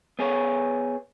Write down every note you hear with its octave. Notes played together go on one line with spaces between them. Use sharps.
B3 G#4 C#5